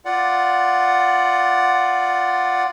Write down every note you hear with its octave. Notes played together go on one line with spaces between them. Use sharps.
F4 D5 F#5